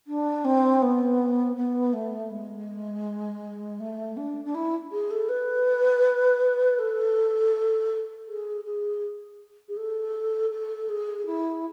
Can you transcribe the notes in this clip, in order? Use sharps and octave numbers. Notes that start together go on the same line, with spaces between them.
D4
C4
B3
B3
A3
G#3
A3
D4
D4
E4
G#4
A4
B4
A4
G#4
G#4
G#4
A4
A4
G#4
E4